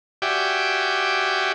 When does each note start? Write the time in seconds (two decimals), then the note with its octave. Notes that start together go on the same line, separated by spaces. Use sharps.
0.22 F#4 G4 D5 E5 G5 G#5